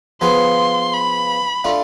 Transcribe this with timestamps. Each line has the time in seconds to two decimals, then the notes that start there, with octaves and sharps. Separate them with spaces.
0.21 F3 B3 F4 G#4 B4 C6
0.93 B5
1.64 A3 D4 F4